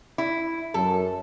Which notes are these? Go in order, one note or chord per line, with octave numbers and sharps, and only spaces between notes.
E4
F#2 A4